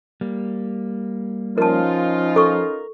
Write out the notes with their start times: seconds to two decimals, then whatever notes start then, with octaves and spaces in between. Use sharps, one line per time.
0.21 G3 A#3
1.58 F3 C#4 D#4 F4 A#4 A5
2.36 A4 A#4 C#6